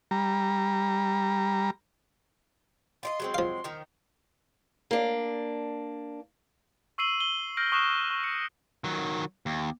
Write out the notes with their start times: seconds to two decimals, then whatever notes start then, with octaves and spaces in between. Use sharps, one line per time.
0.11 G3 A#5
3.03 F4 D5 D#5 C6
3.20 F#3 G#3 C4
3.34 F3 F5
3.64 D#3 F3 D#4
4.91 A#3 D4
6.98 C#6 E6 C7 D#7 F#7 G7
7.21 G7
7.57 F6 G6 A#6 D7 F#7
7.72 C#6 D#6 F#6 C7 E7
8.10 C#6
8.24 C#7
8.84 D#3 F#3
9.46 D#2